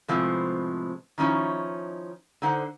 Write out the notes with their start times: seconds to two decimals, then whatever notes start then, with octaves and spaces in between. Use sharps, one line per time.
0.08 A2 C3 F3 G#3 B3 C4
1.18 D#3 F3 C#4 D#4 E4
2.42 D3 D#4 C5 F#5